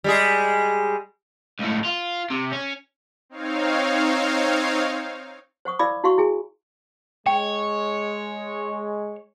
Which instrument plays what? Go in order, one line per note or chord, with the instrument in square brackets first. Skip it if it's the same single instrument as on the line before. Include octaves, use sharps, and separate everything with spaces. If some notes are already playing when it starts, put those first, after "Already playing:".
[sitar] G3 G#3 G#4
[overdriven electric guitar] C#2 A2
F4
C3
C#4
[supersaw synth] C4 D#4 C#5 F5
[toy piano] C5 F#5 C#6 D#6
E4 D5 F5 B5 D6 E6
E4 F#4 F5 F#5 C6 C#6
E4 G#4 G#5
[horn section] G#3 [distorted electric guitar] C#5 [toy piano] G5